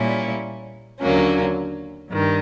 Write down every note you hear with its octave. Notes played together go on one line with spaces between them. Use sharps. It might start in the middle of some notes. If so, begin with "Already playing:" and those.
Already playing: A#2 G3 A#3 C#4 E4
D#2 D3 F#3 A#3 C#4
G2 D#3